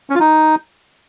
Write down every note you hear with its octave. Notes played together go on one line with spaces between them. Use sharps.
C#4
F4
D#4